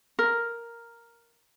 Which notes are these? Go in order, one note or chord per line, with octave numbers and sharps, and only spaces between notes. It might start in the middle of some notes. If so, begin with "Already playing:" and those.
A#4